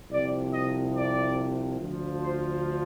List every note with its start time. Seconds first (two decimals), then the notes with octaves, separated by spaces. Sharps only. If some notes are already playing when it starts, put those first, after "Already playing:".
0.10 C2 C3 F3 D5
0.53 D#5
0.95 D5
1.79 D2 D3 F3
2.22 C5